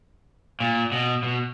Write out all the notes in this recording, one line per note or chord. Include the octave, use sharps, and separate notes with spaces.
A#2
B2
B2